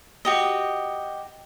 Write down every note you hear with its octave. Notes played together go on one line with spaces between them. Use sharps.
F#4 G4 D#5